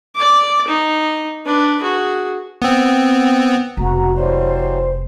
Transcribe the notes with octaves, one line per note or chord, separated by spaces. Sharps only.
D5 D6
D#4
D4 B4
F#4 G#4
B3 C4
F1 B2 F#4 A#5
E3 F#3 G3 C5